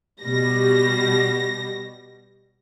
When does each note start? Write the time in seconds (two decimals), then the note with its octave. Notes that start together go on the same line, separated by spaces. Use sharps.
0.21 B2 G3 A#6